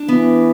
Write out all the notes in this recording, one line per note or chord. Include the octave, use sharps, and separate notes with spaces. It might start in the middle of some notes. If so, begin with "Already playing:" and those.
Already playing: D4
E3 B3